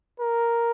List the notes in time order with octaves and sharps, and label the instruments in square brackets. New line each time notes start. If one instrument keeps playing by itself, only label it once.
[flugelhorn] A#4